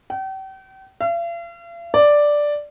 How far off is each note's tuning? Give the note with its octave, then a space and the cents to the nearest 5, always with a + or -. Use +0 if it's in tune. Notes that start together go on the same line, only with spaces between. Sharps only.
G5 -40
F5 -45
D5 +0